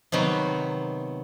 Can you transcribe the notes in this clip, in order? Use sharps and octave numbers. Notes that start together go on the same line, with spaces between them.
C3 D#3 F#3 B3